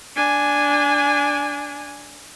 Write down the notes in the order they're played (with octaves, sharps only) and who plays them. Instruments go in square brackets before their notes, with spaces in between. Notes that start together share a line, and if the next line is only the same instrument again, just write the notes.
[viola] D4 G#5